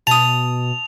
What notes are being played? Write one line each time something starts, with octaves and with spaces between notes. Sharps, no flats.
B2 A5 D#6 F7